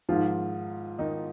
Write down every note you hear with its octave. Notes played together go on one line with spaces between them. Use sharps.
G#2 D#3 F3 F4
D#3 D#4